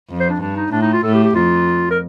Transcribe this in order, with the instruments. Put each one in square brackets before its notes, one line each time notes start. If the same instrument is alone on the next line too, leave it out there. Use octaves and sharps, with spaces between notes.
[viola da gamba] F2
[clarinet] C5
D4
[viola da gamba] G2 [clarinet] D4
[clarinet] D#4
[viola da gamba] A2 [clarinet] D4
[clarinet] D#4
F4
[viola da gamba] A2 [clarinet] A4
[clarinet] G4
G4
[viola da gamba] F2 [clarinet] F4
[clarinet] A#4